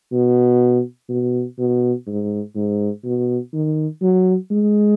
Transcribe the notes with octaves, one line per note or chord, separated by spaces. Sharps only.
B2
B2
B2
G#2
G#2
B2
D#3
F#3
G#3